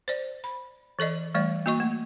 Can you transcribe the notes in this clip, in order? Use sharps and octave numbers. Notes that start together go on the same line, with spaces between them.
C5 D5
B5
E3 A4 D5 D#5
E3 G3 A3 D5
A#3 F#4 D#5 C#6
A3